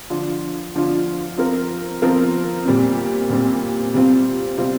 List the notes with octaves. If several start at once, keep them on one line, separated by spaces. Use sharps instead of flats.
D3 F3 D4 F4
D3 F3 D4 F4
F3 C4 F4 A#4
F3 C4 F4 A#4
A#2 G3 C4
A#2 G3 C4
C3 G3 C4 F4
C3 G3 C4 F4